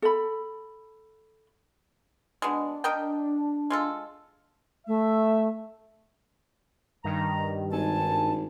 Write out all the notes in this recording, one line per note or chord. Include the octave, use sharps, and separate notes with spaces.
A4 B5
B2 G#3 D4
A#4 D#5 G5
G#3 F4 A4
A3 E5
G2 D#3 A#5
G#1 G#5 A5